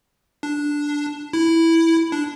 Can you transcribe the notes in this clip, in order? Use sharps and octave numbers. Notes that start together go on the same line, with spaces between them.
D4
E4
D4